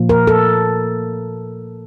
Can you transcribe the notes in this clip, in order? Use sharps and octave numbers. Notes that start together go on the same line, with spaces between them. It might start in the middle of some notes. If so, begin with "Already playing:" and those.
Already playing: A#2 F3 A#3
A#4
A4